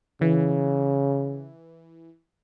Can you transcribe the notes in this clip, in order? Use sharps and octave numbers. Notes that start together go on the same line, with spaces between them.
C#3 E3